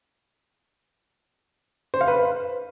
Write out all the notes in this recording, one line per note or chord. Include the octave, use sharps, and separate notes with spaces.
C5
F5
B4